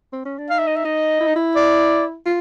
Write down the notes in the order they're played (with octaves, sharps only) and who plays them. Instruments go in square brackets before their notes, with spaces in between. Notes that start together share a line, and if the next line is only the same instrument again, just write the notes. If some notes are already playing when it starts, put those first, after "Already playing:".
[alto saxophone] C4
C#4
D4
[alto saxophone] D#4 [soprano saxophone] F5
[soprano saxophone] E5
D#5
E5
[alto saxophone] D#4 [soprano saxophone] D#5
[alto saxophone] E4
D#4
E4
[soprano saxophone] D5
[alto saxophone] F4